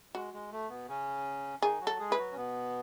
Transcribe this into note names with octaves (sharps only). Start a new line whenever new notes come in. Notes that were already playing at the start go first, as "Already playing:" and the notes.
G#3 F#4
G#3
A3
B2 B3
C#3 C#4
D#3 D#4 G#4
F#3 F#4
A4
G#3 G#4
E4 B4
F#3 F#4
C#4
B2 B3